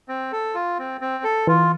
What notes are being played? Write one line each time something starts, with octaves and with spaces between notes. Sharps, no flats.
C4
A4
F4
C4
C4
A4
E3 F4